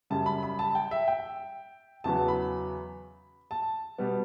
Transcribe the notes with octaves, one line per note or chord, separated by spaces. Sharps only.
F#2 C#3 G3 A5
B5
B5
A5
G5
E5
G5
E2 C#3 F#3 B3 A5
B5
A5
B2 G3 B3